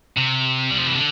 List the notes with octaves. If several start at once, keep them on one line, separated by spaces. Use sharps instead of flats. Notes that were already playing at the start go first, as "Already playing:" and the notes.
C3
G3
F3
E3
D3